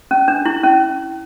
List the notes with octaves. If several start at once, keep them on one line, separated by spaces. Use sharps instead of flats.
C#4
D4
E4
C#4